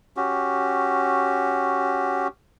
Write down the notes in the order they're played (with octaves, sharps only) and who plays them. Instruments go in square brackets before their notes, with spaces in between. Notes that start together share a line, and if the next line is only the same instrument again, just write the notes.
[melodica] C#4 F#4 G4